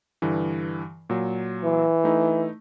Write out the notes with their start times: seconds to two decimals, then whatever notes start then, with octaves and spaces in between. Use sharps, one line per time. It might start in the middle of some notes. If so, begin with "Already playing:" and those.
0.22 G2 D3 E3
1.10 A#2 F#3
1.64 E3
2.04 A3 D#4 E4